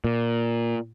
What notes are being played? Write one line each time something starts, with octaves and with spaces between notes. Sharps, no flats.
A#2